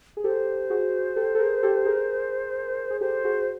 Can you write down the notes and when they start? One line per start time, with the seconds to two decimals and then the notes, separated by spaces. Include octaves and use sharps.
0.17 G#4
0.24 G4 A4 C5
0.70 F#4 G#4
1.16 G4 A4
1.35 A4
1.39 G#4 A#4
1.63 G4 A4
1.85 G#4 A#4
2.90 G#4
3.01 G4 A4 C5
3.24 F#4 G#4